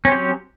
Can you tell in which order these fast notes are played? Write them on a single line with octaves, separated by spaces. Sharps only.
C#4 C4 G4 F#3